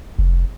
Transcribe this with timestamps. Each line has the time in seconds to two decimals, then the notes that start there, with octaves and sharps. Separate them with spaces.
0.19 F1